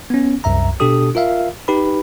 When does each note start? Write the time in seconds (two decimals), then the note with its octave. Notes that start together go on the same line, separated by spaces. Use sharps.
0.10 B3 C#4
0.44 C2 F#2 E5 A#5
0.80 B2 D4 G4 A4 D#6
1.15 F4 A#4 E5 F5
1.68 D#4 G4 B4 B5